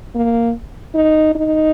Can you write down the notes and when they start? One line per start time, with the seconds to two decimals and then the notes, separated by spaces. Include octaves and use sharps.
0.15 A#3
0.95 D#4
1.35 D#4